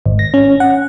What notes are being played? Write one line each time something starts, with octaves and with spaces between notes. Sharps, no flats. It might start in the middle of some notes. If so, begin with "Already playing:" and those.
G#1
A#6
C#4
F#5